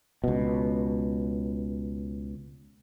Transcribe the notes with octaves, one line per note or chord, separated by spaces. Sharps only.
C#2 B2